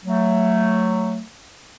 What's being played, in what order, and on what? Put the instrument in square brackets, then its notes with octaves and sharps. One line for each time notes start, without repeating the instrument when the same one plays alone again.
[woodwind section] F#3 A3